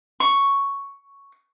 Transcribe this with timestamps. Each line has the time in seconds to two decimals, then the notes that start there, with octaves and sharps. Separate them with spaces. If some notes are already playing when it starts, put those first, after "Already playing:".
0.20 C#6